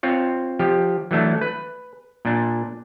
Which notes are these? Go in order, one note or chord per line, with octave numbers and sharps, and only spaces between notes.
C4 F4 C#5
F3 G4
E3 F#3 A3 D4
B4
A#2 D4